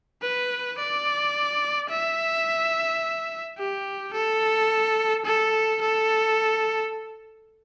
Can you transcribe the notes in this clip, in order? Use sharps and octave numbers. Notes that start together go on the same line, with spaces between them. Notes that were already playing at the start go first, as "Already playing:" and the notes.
B4
D5
E5
G4
A4
A4
A4